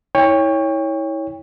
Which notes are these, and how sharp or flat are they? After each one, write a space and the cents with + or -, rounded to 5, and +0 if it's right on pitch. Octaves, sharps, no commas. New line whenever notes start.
E4 -35 C#5 +0 G5 +35